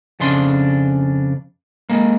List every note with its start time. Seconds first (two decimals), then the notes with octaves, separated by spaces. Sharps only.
0.20 F2 C#3 D4 C6
1.89 G#3 A#3